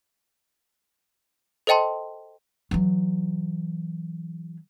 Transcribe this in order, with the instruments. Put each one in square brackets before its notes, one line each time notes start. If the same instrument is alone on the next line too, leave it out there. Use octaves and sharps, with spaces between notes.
[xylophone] A4 C5 D#5 G5 A5 C6
[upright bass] E3 F#3